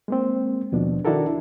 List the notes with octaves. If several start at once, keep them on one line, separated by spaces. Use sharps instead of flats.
G#3 A#3 C4
D#2 B2 F3 D4
D#3 D4 E4 F#4 A4 A#4